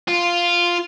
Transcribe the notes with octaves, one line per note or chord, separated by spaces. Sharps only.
F4